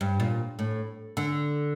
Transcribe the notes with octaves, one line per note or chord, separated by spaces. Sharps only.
G2
A#2
A2
D3